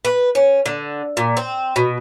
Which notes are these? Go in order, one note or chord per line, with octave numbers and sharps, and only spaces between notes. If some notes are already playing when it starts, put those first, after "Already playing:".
B4
C#4
D3
A#2
C4
B2